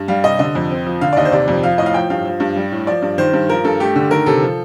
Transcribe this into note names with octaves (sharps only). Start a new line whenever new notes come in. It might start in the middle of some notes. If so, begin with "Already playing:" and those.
Already playing: G2
G3 F5
C3 D#5
D3 D#5
F2
C4
F3
D3 F5
D5
D#2 D#5
C5
C3 D5
F2
F3 F5
A2 D#5
F5
F3 G5
G2 F5
F3
G2
G3
A2
F3 D5
G2
D#3 C5
G2
F3 A#4
G2 A4
A3 G4
D3
D#3 A#4
C3 A4
F3